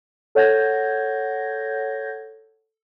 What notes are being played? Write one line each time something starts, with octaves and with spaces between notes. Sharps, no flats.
A4 C#5 F#5 G6 G#6 A#6